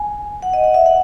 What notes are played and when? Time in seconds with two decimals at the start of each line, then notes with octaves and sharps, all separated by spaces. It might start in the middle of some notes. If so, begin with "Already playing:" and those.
Already playing: G#5
0.42 F#5
0.53 D#5
0.64 F#5
0.74 E5
0.86 F#5